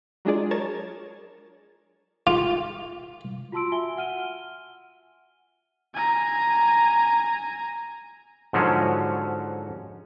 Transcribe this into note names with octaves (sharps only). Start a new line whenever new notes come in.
F#3 G#3 D4 F4 G#4 D5
A#4 C#5 A5 G#6 A6
F4
F4 F#4 A5 C6 E6 D7
F#4 E5 G#5 G7
F#5 F6 D#7 G7
G#5 A#5
G#2 D3 F3 F#3 C#4